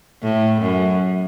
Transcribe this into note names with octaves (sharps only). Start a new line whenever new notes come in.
A2
F#2